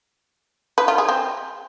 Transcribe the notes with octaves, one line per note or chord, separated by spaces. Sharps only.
B4
F4
G#4
C4